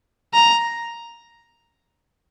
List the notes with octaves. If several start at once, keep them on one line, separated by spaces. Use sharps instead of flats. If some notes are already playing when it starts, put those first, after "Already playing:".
A#5